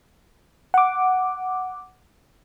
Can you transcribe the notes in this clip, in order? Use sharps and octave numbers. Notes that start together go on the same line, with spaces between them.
F#5 D6